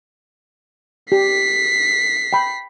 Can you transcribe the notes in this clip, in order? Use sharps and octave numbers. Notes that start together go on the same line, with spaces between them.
G4 B6 C7
G5 B5